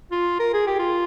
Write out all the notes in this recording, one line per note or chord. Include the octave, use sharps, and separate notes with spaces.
F4
A#4
G#4
G4
F4